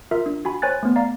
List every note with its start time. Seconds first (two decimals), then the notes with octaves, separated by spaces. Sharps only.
0.11 F4 A#4 E5
0.26 D4
0.45 F#4 G#5 B5
0.62 C5 C#5 G#5 F#6 A6
0.83 A3 B3
0.96 D5 F5 A#5